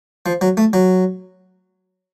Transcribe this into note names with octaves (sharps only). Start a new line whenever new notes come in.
F3
F#3
A3
F#3